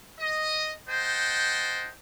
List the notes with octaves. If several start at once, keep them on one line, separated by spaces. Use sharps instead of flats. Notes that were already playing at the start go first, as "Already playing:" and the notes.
D#5
C5 D#5 F#5 G5 A5